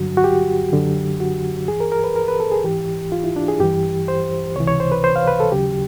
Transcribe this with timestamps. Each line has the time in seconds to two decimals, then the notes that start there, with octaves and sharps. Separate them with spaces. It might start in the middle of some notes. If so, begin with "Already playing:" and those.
Already playing: G2 D3 F#3 F#4
0.17 F#4
0.24 G4
0.72 F#2 D3 F#3
1.20 F#4
1.68 G2 E3 G#4
1.80 A#4
1.92 A#4
2.04 B4
2.16 A#4
2.28 B4
2.40 A4
2.52 G#4
2.64 G#2 E3 G4
3.12 F4
3.24 E4
3.36 D4
3.48 G#4
3.60 G2 E3 G4
4.08 C5
4.56 C#2 C3 E3 C#5
4.67 C#5
4.80 C5
4.92 B4
5.04 C5
5.16 F5
5.28 B4
5.40 A4
5.52 D#2 C#3 F#3 G4